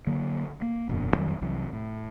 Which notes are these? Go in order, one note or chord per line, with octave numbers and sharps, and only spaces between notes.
D3 F#3 A#3
A#3
E1 F#2 A#2 D3
F2 D#3 F#3 G3
C2 E3 F#3
A2